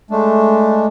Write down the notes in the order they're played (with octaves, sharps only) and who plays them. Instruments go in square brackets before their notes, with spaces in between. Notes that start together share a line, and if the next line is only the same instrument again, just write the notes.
[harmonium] G#3 A3 D4